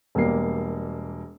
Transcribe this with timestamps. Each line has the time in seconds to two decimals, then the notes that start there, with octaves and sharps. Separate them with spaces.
0.15 E1 G3 A#3 C7